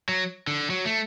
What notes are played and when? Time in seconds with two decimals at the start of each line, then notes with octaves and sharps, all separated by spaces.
0.09 F#3
0.47 D3
0.70 F#3
0.86 A3